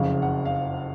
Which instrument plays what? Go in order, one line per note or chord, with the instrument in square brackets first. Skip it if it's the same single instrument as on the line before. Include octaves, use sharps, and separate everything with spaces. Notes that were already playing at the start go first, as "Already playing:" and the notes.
Already playing: [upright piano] F#1 F2 C#3 [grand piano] F5
[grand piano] F#5
F5